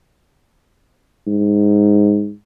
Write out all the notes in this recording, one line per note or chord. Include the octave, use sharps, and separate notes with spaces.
G#2